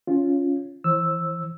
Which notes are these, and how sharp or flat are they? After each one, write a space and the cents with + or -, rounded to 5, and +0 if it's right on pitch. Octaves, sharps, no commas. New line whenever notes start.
C#4 +10 F4 +0
E3 +0 C5 +30 E6 +0